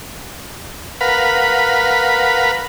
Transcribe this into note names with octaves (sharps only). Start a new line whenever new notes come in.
A#4 B4 F5 F#5 B5